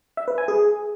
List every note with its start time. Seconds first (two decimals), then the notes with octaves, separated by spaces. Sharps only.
0.17 E5
0.28 B4
0.38 G#5
0.48 G#4